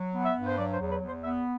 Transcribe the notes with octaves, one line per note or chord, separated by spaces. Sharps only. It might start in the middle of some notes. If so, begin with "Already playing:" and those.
Already playing: F#3
B3
E5
G2
C5
F#3 D5
C5
E2
B4
E2
C5
B3 E5